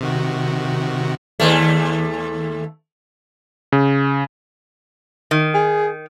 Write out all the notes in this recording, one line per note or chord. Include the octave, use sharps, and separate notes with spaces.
C3 D#3 F#4
D#2 A3
C#3
D#3
G#4